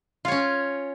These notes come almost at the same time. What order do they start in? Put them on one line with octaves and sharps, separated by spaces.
F4 C#5 C#4